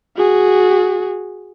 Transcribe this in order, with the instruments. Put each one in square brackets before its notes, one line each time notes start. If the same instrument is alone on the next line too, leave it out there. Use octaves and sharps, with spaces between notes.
[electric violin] F#4 G#4